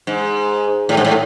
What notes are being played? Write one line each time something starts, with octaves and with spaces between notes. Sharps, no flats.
G#2
A2
G#2
A2